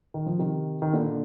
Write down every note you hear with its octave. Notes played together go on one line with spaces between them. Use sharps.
D#3
F3
C3 D#3
D#3
A#2 D3